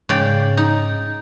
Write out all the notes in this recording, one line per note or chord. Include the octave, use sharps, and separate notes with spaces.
G#2 C#3 D5 G5
D#4